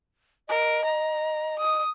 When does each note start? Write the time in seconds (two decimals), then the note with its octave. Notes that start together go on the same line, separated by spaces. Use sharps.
0.49 A#4 D#5
0.85 A#5
1.59 D#6